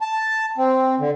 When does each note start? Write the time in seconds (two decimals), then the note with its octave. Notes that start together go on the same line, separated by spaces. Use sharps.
0.01 A5
0.58 C4
1.00 D3